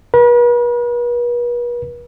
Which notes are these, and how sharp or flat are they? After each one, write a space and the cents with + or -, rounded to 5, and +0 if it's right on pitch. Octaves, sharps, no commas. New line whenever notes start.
B4 -45